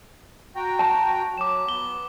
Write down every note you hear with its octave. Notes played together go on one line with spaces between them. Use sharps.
F#4 G5 A#5
A5
F#3 D6 E7
B3 G7